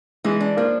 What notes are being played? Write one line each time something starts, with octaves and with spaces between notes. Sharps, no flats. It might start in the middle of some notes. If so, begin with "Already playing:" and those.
E3 G#3
D4
F3 A#3